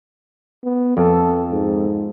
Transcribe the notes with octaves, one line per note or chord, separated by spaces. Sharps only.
B3
F2 A4
G#2